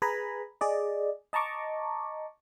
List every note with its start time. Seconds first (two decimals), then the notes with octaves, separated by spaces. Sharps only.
0.02 G#4 B4 G#5 A#5 B5
0.61 G#4 D5 D#5
1.33 D#5 A5 A#5 C#6 D6